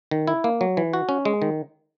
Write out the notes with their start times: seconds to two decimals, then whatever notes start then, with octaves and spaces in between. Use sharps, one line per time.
0.11 D#3
0.27 E4
0.44 A#3
0.61 F#3
0.77 E3
0.93 F#4
1.09 C#4
1.25 G#3
1.42 D#3